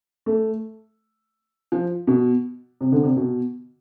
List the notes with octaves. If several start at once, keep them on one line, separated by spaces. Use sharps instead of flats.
A3
F3
B2
C3
D3
C3
B2